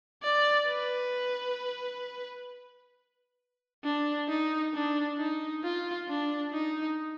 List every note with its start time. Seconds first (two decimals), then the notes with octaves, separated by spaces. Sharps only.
0.23 D5
0.68 B4
3.84 D4
4.29 D#4
4.74 D4
5.18 D#4
5.63 F4
6.08 D4
6.53 D#4